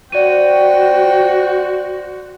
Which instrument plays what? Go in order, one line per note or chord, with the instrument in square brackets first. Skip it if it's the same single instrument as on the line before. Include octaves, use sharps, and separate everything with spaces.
[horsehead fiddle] F#4 [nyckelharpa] C5 G5 [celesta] D5 D#7